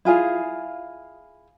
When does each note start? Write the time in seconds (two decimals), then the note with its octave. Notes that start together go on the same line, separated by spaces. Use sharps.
0.05 E4 F4 G#4 F5